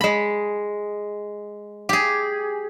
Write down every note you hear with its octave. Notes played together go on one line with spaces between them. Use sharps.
G#3 B5
G4 G#4